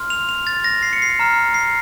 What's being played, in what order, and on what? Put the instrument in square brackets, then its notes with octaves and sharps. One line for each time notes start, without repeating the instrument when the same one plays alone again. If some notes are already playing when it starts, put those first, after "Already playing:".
Already playing: [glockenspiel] C6 F6
F7
F7
A6
A#6
C7
C#7
C7
A#5 F6
C7